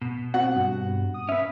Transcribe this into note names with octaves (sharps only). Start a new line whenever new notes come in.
B2
C4 F#4 F#5
G2
D#6
C#4 B4 E5